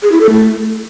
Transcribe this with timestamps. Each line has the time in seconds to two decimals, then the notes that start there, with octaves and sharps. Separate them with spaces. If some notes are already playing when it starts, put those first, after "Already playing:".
0.03 G#4
0.12 E4
0.21 A4
0.30 A3